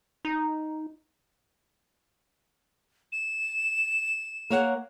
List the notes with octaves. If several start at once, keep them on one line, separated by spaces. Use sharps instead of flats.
D#4
E7
A#3 C#5 F#5